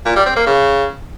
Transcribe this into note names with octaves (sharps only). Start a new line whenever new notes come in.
A#2
G3
C4
A#3
C#3